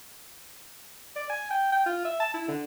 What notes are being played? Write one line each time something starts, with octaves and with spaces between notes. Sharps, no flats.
D5
G#5
G5
G5
F4
E5
A5
E4
D3